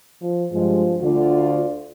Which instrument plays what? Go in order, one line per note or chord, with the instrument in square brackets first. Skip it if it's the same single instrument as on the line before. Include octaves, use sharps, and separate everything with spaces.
[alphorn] F3
[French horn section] G2 G#3 [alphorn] F3
[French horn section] D2 F4 D5 [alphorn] D3